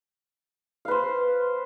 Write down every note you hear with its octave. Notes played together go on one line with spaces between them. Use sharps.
B4 C5 F5